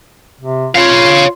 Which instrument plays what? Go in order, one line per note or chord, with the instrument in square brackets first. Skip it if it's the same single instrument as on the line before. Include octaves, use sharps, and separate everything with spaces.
[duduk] C3
[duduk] F4 [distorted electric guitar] C#5 F5